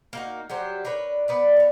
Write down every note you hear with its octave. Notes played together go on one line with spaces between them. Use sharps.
A#3 D#4 F#4
F#3 G3 G4 C5
D4 A#4 B4 C#5
B3 B4 D5
B3 C#5